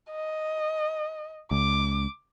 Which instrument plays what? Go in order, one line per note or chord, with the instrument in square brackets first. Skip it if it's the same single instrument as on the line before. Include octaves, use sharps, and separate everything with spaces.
[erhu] D#5
[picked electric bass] C#2 [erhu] D6